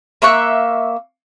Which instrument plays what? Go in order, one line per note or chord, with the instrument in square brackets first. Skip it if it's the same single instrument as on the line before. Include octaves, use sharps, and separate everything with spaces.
[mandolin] A#3 E5 C#6 F#6